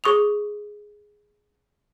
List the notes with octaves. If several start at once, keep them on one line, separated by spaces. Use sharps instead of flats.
G#4 C#6 D#6 F7